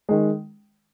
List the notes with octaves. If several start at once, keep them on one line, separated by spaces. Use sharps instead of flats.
D#3 G#3